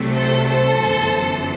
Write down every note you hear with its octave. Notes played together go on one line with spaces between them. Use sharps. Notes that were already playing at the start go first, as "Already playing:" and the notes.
Already playing: C2 C3 F#3 A3
A4 C5
A4 C5
G1 F#2 E3